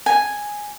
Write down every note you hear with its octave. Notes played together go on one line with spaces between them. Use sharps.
G#5